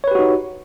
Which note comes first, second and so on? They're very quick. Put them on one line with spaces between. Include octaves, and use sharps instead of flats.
C#5 B4 G4 F#4 D#4